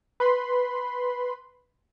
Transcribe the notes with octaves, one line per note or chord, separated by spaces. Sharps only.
B4 B5 C6